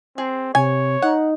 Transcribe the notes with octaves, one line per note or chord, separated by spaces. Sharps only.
C4 G#4
C3 C#5 G#5
D#4 F#5